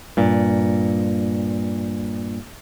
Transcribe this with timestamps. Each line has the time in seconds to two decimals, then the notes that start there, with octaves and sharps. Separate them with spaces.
0.17 G2 A#2